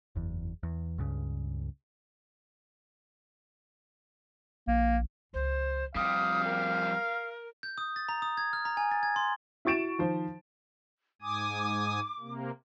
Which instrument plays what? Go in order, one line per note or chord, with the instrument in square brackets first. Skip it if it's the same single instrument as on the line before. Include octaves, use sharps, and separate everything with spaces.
[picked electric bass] F#1 E2
E2
C#2 G2 C#3
[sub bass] A#1 [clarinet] A#3
[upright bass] C#2 F3 [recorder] C5
[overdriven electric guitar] F2 G3 [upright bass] C4 [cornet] F5 [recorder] D#6
[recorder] A#4
[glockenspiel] G6
D#6
A6
A#5
D#6
G#6
F6
A#5
G#5
A6
G#6
C6
[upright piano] E4 F#4 C#6 A6 D7 E7
D#3 F3 C5
[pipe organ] G#2 G#5 D#6 [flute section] D6
[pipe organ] C3 A#3